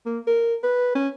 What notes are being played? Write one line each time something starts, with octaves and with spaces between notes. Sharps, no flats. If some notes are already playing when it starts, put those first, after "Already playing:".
A#3
A#4
B4
C#4